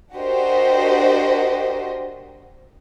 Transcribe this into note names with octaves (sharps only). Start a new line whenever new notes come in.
D4 F#4 G4 A#4 C5 D#5